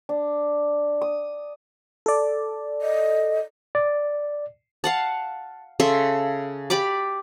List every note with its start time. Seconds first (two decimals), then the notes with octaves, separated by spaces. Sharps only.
0.09 D4
1.02 D#6
2.06 A4 D5
2.81 D#5
3.75 D5
4.84 F5 F#5 A5
5.80 C#3 A4 E5 C6
6.70 G4 D5 B5 D6